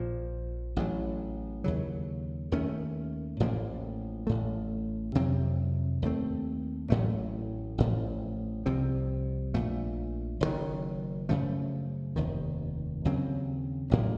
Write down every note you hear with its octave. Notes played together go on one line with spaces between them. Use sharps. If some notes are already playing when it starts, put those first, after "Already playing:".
Already playing: A#1 A#2 F3
A1 A2 F#3
D#2 C#3 F#3
D#2 D#3 A3 C#4
A1 A2 F3 A#3
A1 A2 A3
F2 C3 F#3 C4
D#2 D#3 A3 C4
A1 A2 F#3 A3
A1 A2 F3
C2 C3 F3 C4
A#1 A#2 A3
F#1 F#2 D#3 F#3
F#2 C#3 F3 A3
F1 D#2 D#3
D#2 C#3 F#3 C4
A1 A2 F#3 A#3